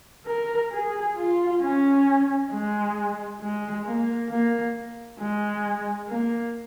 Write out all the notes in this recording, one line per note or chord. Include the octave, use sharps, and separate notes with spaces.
A#4
G#4
F4
C#4
G#3
G#3
A#3
A#3
G#3
A#3